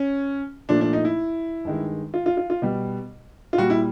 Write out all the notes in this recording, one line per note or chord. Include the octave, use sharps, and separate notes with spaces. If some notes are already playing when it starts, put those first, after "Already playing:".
Already playing: C#4
A#2 F3 A3 D4
D4
D#4
E4
G2 D#3 G#3
F4
F4
F4
F4
B2 G3
F4
A#2 G3 F#4
E4